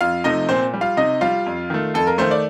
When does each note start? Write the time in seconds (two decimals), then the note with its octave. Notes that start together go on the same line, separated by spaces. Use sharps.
0.01 F2 F4 F5
0.24 C3 F3 A3 D#4 D#5
0.49 A#2 C4 C5
0.74 G3
0.81 F4 F5
0.97 C3 D#4 D#5
1.21 G3 F4 F5
1.46 F2
1.70 D#3 A3
1.94 F2 A4
2.07 A#4
2.18 D#3 A3 C5
2.31 D5